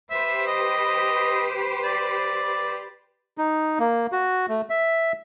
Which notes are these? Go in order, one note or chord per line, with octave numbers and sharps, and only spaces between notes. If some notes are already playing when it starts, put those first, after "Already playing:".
G4 B4 C5 E5
D#5
D5
D#4
A#3
F#4
A3
E5